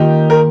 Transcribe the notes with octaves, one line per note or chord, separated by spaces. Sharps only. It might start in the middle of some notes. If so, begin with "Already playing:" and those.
Already playing: D#3 A#3 D#4 F4 G4
A#4